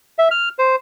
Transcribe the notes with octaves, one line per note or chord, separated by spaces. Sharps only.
E5
F6
C5